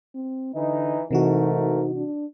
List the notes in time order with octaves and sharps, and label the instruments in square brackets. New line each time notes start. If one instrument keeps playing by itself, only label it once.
[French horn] C4
[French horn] D3 [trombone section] E3 D#4
[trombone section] G#2 A3 A#4 [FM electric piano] C3 E3 F#4 [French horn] D#4
[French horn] D#4
D4